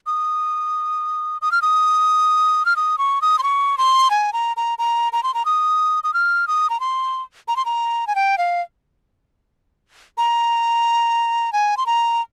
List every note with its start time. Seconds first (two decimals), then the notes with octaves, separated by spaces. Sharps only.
0.06 D#6
1.42 D#6
1.52 F6
1.62 D#6
2.66 F6
2.76 D#6
2.98 C#6
3.22 D#6
3.39 C6
3.43 C#6
3.78 C6
4.11 G#5
4.33 A#5
4.57 A#5
4.78 A#5
5.13 A#5
5.23 C6
5.34 A#5
5.45 D#6
6.04 D#6
6.14 F6
6.48 D#6
6.70 A#5
6.80 C6
7.48 A#5
7.56 C6
7.65 A#5
8.07 G#5
8.15 G5
8.38 F5
10.18 A#5
11.53 G#5
11.77 C6
11.86 A#5